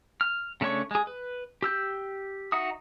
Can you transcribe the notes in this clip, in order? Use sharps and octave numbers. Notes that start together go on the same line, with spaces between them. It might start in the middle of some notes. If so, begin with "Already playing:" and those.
F6
C#3 A3 D4 C#5 C#6
G#3 G#4
B4
G4 E6 G6
D#4 F#4 E5 D#6